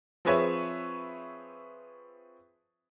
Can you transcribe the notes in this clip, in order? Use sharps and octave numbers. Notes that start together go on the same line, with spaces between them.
F3 C4 G#4 B4 C#5 E5